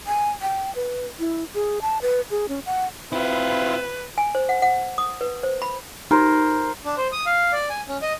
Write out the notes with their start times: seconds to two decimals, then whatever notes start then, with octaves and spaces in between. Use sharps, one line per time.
0.07 G#5
0.42 G5
0.75 B4
1.19 E4
1.54 G#4
1.82 A5
2.02 B4
2.31 G#4
2.48 C#4
2.66 F#5
3.12 C4 E4 F4 B4
4.18 G#5
4.35 C5
4.49 F#5
4.62 F#5
4.98 D#6
5.21 B4
5.43 C5
5.62 B5
6.11 D#4 A#4 C5
6.85 D4
6.97 C5
7.12 D#6
7.26 F5
7.52 D5
7.70 G#5
7.88 C#4
8.02 D#5